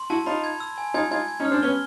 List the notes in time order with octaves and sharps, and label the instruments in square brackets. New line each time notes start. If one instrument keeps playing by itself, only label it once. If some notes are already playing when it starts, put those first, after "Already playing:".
Already playing: [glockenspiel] C6
[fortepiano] E4 F#4 [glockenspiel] A5
[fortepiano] D#4 F4 [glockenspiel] B5
[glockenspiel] G#6
E6
G#5
[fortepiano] D#4 F4 [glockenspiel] G#6
[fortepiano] D#4 F4 [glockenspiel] G#6
[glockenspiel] G#6
[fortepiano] C#4 D#4
[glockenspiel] F6
[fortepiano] C4 D4
[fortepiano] B3 C#4 [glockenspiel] G7